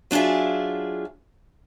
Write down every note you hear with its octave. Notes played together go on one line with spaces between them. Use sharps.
F#3 D4 F4 G#4 E5